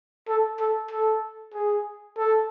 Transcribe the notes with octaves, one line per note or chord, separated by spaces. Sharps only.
A4
A4
A4
G#4
A4